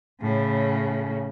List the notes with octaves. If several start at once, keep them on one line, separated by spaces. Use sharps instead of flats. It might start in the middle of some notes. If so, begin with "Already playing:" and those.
A2 C#3